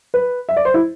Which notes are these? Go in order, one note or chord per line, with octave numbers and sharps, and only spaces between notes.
B4
E5
D5
C5
E4